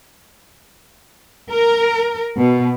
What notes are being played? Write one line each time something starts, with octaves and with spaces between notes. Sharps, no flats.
A#4
B2